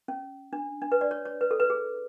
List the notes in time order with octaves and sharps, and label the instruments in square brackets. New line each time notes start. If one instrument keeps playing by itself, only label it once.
[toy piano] C#4
D4
D4
B4
D5
C#5
C#5
B4
A4
B4
G#4